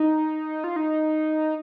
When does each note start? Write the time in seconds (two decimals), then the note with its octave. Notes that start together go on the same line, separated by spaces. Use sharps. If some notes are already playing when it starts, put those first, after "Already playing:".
Already playing: D#4
0.64 F4
0.76 D#4